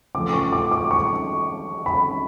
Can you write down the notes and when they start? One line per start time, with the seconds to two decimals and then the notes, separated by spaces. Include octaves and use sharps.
0.14 C#3 F3 A3 D6
0.33 C#6
0.53 D6
0.71 D6
0.91 C#6
1.86 B5